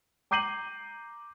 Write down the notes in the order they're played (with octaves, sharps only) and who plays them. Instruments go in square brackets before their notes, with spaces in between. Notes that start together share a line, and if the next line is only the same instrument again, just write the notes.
[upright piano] A#5 D6 G6 C7 D#7 F#7